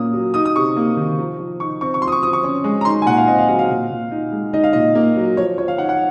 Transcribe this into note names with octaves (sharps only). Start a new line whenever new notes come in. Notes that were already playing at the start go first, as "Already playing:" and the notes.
Already playing: A#2 A#3 C#4 D#6
F#3
D#4 D#6
D#6
C3 C#6
A#3
D#3
F3
F3
D#4 C#6
C4 C#6
C#6
F3 C6
D#6
C#6
F3 D#6
C#6
C#4
G#3
A#5
D#4 C6
G#5
A#2 F#5
F5
C4 D#5
F5
F#3 F#5
F5
A#2
A#2
D#4
G#3
D#4 D#5
F5
A#2 D#5
A#3
F#3
F3 C#5
F3 C#5
F5
D#4 F#5
F#5